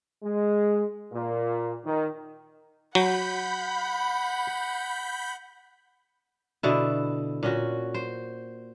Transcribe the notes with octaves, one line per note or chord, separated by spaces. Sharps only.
G#3
A#2
D#3
F#3 F#5 B5 G6
B2 D3 E4
A#2 C#4 F#4
C5